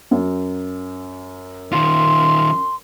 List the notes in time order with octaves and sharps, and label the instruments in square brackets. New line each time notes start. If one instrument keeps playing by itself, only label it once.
[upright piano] F#2
[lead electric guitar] D#3 F4 [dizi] C6